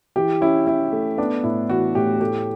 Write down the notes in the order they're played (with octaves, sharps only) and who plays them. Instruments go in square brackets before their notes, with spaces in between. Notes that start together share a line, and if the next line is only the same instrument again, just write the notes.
[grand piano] E3 [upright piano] G4
[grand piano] C#4 [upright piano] E4
[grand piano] C#4 [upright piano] E4
[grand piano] A3
[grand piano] B3 [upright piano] D4
[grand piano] A2 [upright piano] E4
[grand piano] E3 [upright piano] F#4
[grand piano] A2 [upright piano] G4
[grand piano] A3 [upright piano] G4